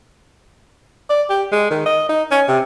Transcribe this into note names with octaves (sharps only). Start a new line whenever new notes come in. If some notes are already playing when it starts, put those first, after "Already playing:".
D5
G4
G#3
D#3
D#5
D#4
C#4
C3